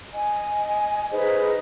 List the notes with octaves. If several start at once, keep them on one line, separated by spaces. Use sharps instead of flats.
D#5 G#5
D#4 G#4 B4 C5 D#5